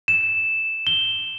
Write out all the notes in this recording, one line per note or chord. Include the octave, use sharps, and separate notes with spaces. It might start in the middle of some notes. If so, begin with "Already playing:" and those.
E7
G7